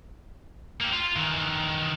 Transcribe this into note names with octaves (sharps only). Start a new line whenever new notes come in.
A#3 G4
F4
D#3 E3